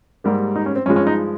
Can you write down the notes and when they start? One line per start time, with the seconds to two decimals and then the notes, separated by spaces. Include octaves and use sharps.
0.24 G#2 G3 A#3 G4
0.56 D#4
0.66 C#4
0.76 C4
0.86 G2 F3 G#3 C#4
0.96 C#4
1.07 D#4